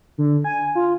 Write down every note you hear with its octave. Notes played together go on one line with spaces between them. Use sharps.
D3
G#5
F4